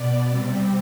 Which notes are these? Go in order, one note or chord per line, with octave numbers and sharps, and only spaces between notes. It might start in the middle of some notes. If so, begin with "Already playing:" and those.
Already playing: B2 B3 D5
C3 G3 C4